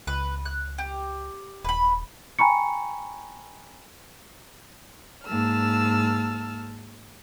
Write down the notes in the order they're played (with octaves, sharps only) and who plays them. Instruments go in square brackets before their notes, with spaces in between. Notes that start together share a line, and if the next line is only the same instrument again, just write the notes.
[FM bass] C#2 [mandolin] B4
[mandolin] F#6
G4
[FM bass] D#1 [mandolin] B4 B5
[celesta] G5 G#5 A#5 B5 C#6 C#7
[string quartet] G#2 A#3 A5 E6 F6